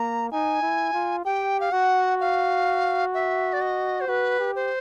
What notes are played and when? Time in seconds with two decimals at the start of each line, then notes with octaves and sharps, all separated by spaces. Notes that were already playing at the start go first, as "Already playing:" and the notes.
Already playing: A#3 A#5
0.31 D#4 G#5
0.62 E4
0.93 F4
1.25 G4 G5
1.60 F5
1.72 F#4 F#5
2.20 F5
3.14 E5
3.53 D5
3.61 D#5
4.01 C5
4.08 F#4 B4
4.39 G4
4.56 C5